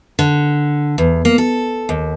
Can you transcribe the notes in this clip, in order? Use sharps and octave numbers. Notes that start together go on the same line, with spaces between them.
D3
E2
A#3
A4
D#2